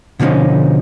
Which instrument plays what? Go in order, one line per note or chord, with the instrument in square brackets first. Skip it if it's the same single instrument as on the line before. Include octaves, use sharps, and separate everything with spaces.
[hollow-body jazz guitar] B2 D3 F3 C4 C#4 D#4